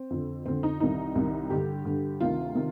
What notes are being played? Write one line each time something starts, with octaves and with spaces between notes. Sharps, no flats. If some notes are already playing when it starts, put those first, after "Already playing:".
Already playing: C4
F2 D3
F2 D3 C4
D#4
C2 C3 D#3 D#4
C2 C3 D#3
G2 D3 G4
G2 D3
D2 C3 D#3 F4
C3 D#3